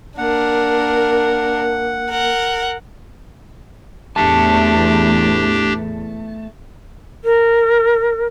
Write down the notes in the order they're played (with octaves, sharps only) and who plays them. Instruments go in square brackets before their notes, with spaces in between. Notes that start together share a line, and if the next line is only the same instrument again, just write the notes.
[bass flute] A#3 [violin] D4 A#4 [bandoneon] F#5
[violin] A#4 F#5
[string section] E2 A2 [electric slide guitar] A3 A5 [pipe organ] D4 G4
[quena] A#4